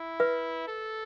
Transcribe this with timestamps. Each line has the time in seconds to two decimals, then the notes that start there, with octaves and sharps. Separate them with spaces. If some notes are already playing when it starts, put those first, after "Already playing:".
Already playing: E4
0.20 B4 E5
0.68 A4